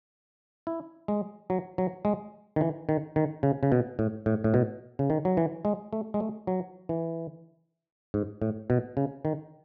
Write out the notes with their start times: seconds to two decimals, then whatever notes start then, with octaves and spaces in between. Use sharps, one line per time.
0.67 E4
1.08 G#3
1.50 F#3
1.78 F#3
2.05 G#3
2.56 D#3
2.61 E3
2.89 D#3
3.16 D#3
3.43 C#3
3.63 C#3
3.72 B2
3.99 A2
4.26 A2
4.44 A2
4.54 B2
4.99 C#3
5.10 D#3
5.25 F#3
5.37 E3
5.65 G#3
5.93 A3
6.14 G#3
6.20 A3
6.47 F#3
6.89 E3
8.14 G#2
8.42 A2
8.70 B2
8.97 C#3
9.25 D#3